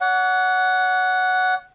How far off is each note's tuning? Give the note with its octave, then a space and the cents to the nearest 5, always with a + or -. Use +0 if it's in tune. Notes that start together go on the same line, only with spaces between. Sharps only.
C#5 +40 F#5 +0